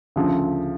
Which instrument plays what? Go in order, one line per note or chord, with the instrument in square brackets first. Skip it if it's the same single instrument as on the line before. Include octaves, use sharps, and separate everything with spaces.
[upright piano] D2 C#3 F3